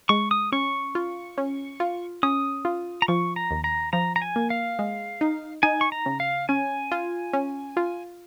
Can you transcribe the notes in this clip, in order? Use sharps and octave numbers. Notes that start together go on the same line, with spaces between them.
G#3 C#6
D#6
C#4 C#6
F4
C#4
F4
C#4 D#6
F4
A#5
F3 C#6
A#5
D#2
A#5
F3 A#5
A#5
G#5
A#3
F5
G#3
D#4
D#4 G#5
C#6
A#5
C#3
F5
C#4 G#5
F4
C#4
F4